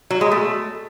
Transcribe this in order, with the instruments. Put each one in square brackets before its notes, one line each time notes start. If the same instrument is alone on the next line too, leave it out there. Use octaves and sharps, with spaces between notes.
[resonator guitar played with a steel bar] F#3
G#3
A3